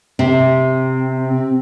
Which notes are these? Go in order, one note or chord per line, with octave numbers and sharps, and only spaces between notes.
C3 C4